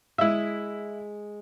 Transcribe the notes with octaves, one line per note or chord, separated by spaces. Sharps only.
G#3 E4 D#5 E5